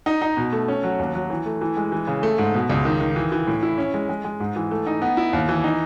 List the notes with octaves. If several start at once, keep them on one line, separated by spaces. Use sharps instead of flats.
D#4
D#4
B2
A3
C#4
F#3
D#2
F#3
E3
A3
E3
G#3
E3
C#3
A3
G#2
B2
C#2
D#3
D#3
E3
E3
A2
E4
C#4
G#3
G#3
G#3
G#2
E3
A3
D#4
B3
E4
D#2
E3
D#4